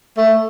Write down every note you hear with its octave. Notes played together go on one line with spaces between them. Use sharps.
A3